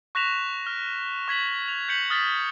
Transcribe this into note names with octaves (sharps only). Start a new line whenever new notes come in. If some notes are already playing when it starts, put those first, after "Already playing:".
C#6 F#6 A#6 B6 E7 F7
F6
C#6 G#6 B6 F#7
F7
G6 B6 C#7 F#7
D#6 F6 A6 B6